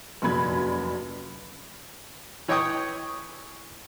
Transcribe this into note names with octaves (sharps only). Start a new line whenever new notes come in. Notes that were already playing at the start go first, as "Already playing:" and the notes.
F1 A#1 F#2 B5 G#6
E3 C#5 D#5 G5 C#6 D#6